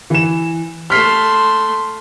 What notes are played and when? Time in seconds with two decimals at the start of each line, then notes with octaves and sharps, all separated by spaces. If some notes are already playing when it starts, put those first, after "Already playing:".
0.10 E3 E7
0.90 A3 C6 F6 B6 C7